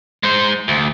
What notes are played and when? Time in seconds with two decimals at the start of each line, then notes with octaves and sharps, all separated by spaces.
0.23 G#3 C5
0.68 D2